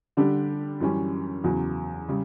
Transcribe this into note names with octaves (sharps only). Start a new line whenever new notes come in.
D3 G3 D4 G4
F#2 E3 G3 C#4
E2 C#3 F#3
C#3 G3